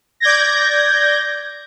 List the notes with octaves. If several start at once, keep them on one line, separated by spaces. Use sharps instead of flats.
D5 G6 G#6 A#6